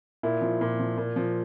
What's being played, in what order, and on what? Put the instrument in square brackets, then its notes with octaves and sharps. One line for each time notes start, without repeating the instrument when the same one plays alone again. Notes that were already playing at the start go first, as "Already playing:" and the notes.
[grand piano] A#2 E4
F3
A#2
F3
A#2
F3